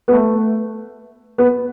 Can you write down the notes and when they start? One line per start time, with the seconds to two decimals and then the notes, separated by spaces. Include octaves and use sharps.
0.08 B3
0.12 A3
1.38 B3